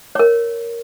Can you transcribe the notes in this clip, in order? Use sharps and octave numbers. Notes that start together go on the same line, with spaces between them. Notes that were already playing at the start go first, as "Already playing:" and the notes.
A#4 C#5